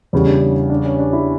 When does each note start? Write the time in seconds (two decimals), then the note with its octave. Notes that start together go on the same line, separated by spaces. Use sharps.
0.13 E2 C#3 G3 E4
0.27 D4
0.41 C#4
0.70 D4
0.85 C#4
0.99 D4
1.13 E4